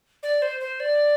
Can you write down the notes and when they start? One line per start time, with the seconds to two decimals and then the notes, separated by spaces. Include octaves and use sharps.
0.23 D5
0.42 C5
0.60 C5
0.80 D5